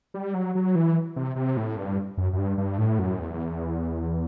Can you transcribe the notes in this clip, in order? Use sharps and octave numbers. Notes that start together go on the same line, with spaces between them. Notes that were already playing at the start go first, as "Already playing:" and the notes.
G3
F#3
F#3
E3
C3
C3
A2
G2
F#2
F#2
G2
G2
A2
F#2
E2